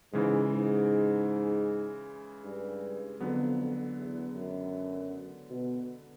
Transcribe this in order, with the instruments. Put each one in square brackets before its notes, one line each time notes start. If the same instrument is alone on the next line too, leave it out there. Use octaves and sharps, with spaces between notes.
[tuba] G#2 [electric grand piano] C#3 E3 G#3
[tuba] G#2
G2
[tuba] F2 [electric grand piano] D3 F#3 B3
[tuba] E2
F#2
B2